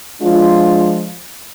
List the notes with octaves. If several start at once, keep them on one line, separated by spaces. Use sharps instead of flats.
F3 G#3 D4 F4